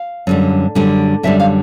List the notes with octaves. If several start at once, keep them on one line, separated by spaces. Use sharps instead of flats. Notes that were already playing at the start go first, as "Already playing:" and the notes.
Already playing: F5
F#2 D3 G3
F#2 D3 G3
F#2 D3 G3 E5
F5